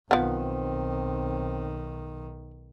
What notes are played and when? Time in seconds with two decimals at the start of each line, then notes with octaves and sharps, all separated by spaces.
0.11 B1 D#3 F3 B3 C4